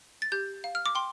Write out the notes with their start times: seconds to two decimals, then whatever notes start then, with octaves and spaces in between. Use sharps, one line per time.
0.22 A6
0.32 G4 G6
0.64 F5
0.75 F6
0.86 D6
0.95 G5 C6